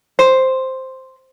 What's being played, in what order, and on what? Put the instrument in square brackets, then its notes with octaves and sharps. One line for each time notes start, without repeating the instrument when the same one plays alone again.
[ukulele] C5